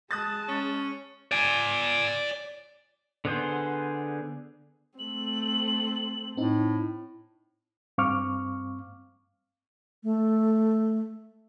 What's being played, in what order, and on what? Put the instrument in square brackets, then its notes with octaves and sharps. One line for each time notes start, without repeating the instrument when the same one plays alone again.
[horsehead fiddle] G#3 A5 [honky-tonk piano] D#6 F#6 A6
[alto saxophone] C#4
[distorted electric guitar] D5 G#5
[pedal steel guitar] D3 B3 G#4 C5
[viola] A3 C4 [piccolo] F#7
[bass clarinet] A2 [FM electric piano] C4 D#4
[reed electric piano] G2 C4 F5 C#6 D6 F6
[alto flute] A3